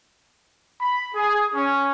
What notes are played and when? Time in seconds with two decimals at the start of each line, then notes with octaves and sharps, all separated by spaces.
0.81 B5
1.14 G#4
1.53 C#4